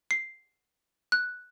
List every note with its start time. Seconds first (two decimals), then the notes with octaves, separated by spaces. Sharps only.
0.11 C7
1.12 F#6